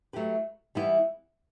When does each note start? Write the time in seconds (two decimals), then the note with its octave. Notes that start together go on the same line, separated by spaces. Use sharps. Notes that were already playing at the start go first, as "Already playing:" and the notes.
0.13 F#3 A3 E4 G4 B4
0.75 E3 G3 B3 E4